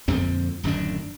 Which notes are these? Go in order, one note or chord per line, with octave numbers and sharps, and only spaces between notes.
F2 A#2 D3 C4
D1 F#2 D#3 D4